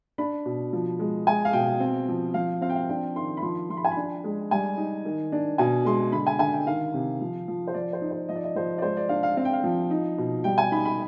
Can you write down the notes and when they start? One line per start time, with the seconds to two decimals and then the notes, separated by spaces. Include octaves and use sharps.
0.18 D4 B5
0.46 B2
0.73 F3
0.99 G#3
1.27 G#3 G#5
1.45 F5
1.53 B2 G5
1.80 C4
2.08 F3
2.34 F3 F5
2.61 C4 F5
2.70 G5
2.76 F5
2.89 D4 G5
3.16 D#3 C6
3.37 B5
3.42 F3 C6
3.70 F3 C6
3.77 B5
3.85 G#5
3.91 B5
3.97 D4
4.24 G#3
4.51 G3 G#5
4.77 D#4
5.05 D#3
5.32 D4
5.58 B2 G#5
5.85 G#3 C6
6.12 D3 B5
6.27 G#5
6.39 D3 G#5
6.53 G5
6.67 D#3 F5
6.94 C3
7.21 F3
7.48 F3
7.67 C5
7.74 F3 D5
7.93 C5
8.02 D#4
8.11 C5
8.29 F3 D#5
8.36 D5
8.44 D#5
8.55 F3 C5
8.78 D5
8.82 G#3 C5
8.97 D5
9.09 D4 F5
9.23 F5
9.37 C4 F5
9.45 G5
9.53 F5
9.64 F3
9.91 D#4
10.18 B2
10.44 G3 G5
10.58 G#5
10.72 D#4 B5
10.85 B5